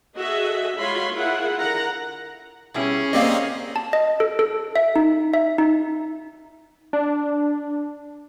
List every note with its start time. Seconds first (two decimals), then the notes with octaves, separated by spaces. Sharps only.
0.17 F#4 G#4 A4 D#5 E5
0.77 G#3 F4 F#4 C#5 B5 C6
1.12 E4 F4 G#4 A#4 F#5
1.59 D3 A#4 F#5 A#5
2.74 B2 G3 C#4 E4 G#4
3.13 A#3 C4 G4 D5 D#5 F5
3.76 A5
3.93 D#5
4.20 A4
4.39 A4
4.76 E5
4.96 D#4
5.34 E5
5.58 D#4
6.93 D4